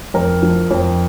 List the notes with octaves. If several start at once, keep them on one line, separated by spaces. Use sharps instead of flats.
F2 A#4
F3
F2